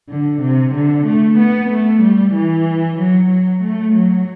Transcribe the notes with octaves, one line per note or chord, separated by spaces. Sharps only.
D3
C3
D3
A3
B3
A3
G3
E3
F#3
F#3
A3
F#3